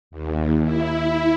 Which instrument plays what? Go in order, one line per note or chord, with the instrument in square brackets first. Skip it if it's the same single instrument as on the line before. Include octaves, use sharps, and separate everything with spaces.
[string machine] D#2
E4